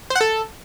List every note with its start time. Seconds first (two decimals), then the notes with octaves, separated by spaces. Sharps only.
0.10 C5
0.15 F#5
0.21 A4